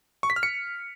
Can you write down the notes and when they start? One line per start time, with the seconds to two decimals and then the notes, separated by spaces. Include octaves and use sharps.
0.23 C#6
0.30 B6
0.36 F6
0.43 C#7